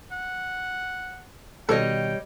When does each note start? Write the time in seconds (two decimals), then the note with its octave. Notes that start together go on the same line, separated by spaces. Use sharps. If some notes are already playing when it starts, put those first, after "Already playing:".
0.12 F#5
1.69 B2 D#3 G3 A4 C#5 D#5 G5